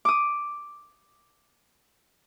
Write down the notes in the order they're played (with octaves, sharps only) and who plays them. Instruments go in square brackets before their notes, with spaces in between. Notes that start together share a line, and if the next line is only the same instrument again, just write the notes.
[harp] D6 D#6